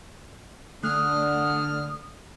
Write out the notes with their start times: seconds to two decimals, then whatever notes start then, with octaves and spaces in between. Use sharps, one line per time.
0.84 D3 A3 D#6 F6 F#6